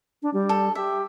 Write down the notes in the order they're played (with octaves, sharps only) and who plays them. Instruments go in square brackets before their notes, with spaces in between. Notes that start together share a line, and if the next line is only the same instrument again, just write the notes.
[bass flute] D4
G3
[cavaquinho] A4
[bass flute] G4 [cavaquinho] E5